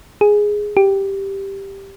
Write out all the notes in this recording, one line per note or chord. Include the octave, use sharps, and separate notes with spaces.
G#4
G4